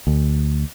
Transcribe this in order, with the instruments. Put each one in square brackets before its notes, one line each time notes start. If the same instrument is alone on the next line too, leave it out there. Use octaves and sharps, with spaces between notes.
[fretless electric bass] D2